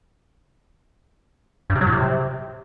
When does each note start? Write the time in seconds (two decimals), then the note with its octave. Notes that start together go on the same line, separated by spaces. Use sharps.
1.70 G2
1.75 C3
1.81 F#3
1.87 A2
1.92 C3